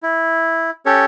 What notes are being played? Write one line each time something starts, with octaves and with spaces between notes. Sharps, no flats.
E4
C#4 G4 A4 C#5